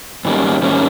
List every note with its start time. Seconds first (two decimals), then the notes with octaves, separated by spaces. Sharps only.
0.25 G#2 D#3 G3 A#3 C#4
0.63 G#2 D#3 G3 A#3 C#4